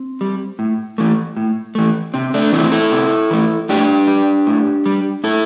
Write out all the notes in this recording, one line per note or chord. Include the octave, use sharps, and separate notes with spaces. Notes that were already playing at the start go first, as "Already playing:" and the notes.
Already playing: C4
G3
A2
E3 A3
A2
E3 A3
C3 C4
A3 D4
E3 A3 C4 E4
E4 A4
C3
E3 A3
A2 D4 G4
G3
A2
G3
A2 E4 A4